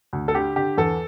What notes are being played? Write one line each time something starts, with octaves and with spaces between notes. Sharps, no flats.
D2
A4
D3 G4
D3 G4
E2 A4